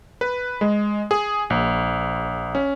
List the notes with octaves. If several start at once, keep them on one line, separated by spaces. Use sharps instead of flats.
B4
G#3
G#4
A#1
C#4